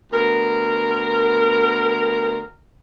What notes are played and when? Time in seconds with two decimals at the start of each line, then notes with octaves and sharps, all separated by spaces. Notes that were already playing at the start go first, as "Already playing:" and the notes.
0.13 D2 B3 A#4